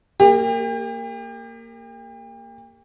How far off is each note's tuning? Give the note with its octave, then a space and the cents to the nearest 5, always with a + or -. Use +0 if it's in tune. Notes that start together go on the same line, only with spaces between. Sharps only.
A#3 -20 G4 +35